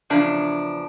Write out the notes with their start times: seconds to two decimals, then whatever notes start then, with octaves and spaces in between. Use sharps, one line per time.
0.10 E2 C#3 F3 D4